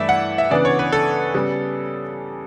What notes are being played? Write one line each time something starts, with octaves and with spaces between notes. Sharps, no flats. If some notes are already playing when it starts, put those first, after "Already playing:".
Already playing: G2 E3 A3 E4 D5 E5
F#5
E5
C#3 E3 B3 D4 D5
C#5
B4
A4
C#3 G3 B3